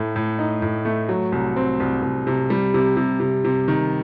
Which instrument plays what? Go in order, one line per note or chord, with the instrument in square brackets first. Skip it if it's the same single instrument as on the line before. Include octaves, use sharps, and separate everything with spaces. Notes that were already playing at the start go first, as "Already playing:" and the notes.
Already playing: [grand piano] A2 A3
A2
D#4
A2
A3
F#3
C2
C4
C2
C2
C3
G3
C3
C3
C3
C3
D#3